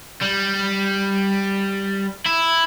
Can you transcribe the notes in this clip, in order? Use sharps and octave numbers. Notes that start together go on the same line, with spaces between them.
G3
E4